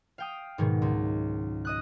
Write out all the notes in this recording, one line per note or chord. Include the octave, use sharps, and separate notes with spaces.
F5 G5 D#6
G#2 B2 D#3 F#3 G#3
C#2
D#5 D#6 F#6